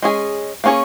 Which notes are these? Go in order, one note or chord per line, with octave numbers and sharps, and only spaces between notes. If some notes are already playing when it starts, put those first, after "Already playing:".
G#3 C#4 G#4
A#3 C#4 G#4 C#5